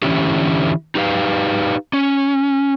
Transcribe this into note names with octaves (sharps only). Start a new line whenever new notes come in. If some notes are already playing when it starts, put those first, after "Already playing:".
D3 E3 C#4 E4 F4 G4
D#4 G4 B4 F5
C#4